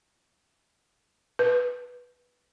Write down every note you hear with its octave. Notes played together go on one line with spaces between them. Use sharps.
B4